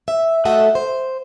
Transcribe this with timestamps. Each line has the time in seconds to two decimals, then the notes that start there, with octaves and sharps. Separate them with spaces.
0.08 E5
0.45 A3 F#4 A4 D#5 E5 F#5
0.75 C5